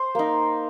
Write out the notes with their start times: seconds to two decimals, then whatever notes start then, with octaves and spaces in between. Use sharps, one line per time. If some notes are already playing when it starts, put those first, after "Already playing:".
Already playing: C5
0.15 A#3 D#4